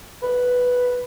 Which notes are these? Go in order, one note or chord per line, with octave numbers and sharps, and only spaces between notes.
B4